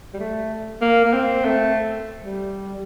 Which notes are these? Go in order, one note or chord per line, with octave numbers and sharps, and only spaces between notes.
G3
A3
A#3
A#3
C4
A3
G3